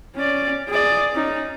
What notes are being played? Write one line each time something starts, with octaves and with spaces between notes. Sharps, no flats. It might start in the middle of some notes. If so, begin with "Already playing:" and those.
C#4 D5
G#4 D5
C#4 D#4